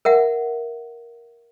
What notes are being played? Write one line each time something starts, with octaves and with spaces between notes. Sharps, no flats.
A#4 E5 F#5